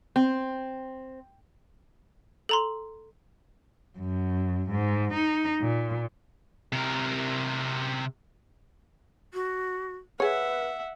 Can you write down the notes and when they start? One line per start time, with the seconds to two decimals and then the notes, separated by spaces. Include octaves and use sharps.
0.16 C4
2.49 A4 A#5 C6
3.98 F#2
4.71 G#2
5.14 D#4
5.61 A#2
6.73 C3 A#4
9.34 F#4
10.20 G#4 B4 C#5 E5 F#5